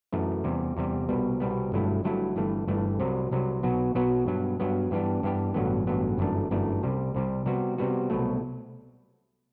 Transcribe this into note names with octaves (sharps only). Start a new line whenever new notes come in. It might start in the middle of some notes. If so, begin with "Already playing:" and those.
F#2 E3 A3
E2 C3 G3
E2 C3 G3
C2 B2 G3 B3
C2 B2 G3 B3
G1 G2 F#3 A3 E4
G1 G2 F#3 A3 E4
G1 G2 E3 A3
G1 G2 E3 A3
C2 C3 F#3
C2 C3 F#3
B1 B2 F#3 B3 F#4
B1 B2 F#3 B3 F#4
G2 F#3 B3
G2 F#3 B3
G2 E3 B3 D4 G4
G2 E3 B3 D4 G4
A1 G2 D3 F#3 B3
A1 G2 D3 F#3 B3
G1 F#2 E3 A3 D4
G1 F#2 E3 A3 D4
C2 C3 G3
C2 C3 G3
C3 G3 B3 F#4
C3 G3 B3 F#4
C2 B2 F#3 A3